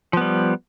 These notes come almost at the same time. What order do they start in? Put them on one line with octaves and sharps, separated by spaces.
F3 B3 G3